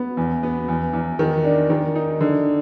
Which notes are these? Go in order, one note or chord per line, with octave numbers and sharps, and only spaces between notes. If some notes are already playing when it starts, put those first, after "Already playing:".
Already playing: B3
E2
B3
E2
E2
D#3
D4
D#3
D#4
D3